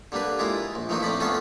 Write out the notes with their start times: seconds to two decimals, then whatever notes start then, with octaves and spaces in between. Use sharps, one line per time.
0.12 D3 G3 A#3 D4 B4
0.39 G#3 E4 F4 A#4
0.75 A#1
0.89 E3 F3 A3 A#3 D4 D#4
1.03 A2 C4 D5 B5
1.20 A3 B3 C#4 D4 F4 A4